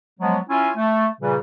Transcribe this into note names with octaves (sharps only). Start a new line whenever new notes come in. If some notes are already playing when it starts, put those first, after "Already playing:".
F3 F#3 G#3 B3
C#4 E4 F4 G#5
A3
A#2 C#3 E3 G3